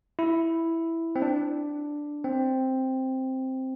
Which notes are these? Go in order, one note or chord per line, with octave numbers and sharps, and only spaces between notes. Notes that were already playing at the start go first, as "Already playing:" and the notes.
E4
C4
D4
C4